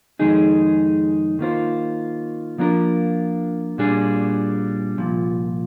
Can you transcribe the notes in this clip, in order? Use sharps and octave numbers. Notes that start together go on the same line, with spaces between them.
F2 D#3 G#3 D#4 G#4
D#3 A#3 F4 C5
F3 A#3 D4 F4 A#4
A#2 G3 D4 G#4
C2 A#2 F3